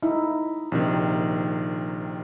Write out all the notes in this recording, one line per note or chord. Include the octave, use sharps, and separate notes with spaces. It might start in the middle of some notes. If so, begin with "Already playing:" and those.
D#4 E4
A#1 C3 D#3